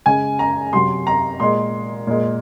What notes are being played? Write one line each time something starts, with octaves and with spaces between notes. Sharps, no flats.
C#3 G#3 G#5
A#5
C3 F#3 C6
A#5
A#2 G#3 C6
A#2 G#3